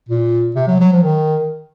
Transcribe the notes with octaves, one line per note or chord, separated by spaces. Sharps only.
A#2
C3
F#3
F#3
F3
D#3